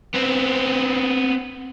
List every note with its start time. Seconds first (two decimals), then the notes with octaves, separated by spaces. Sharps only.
0.15 B3 C4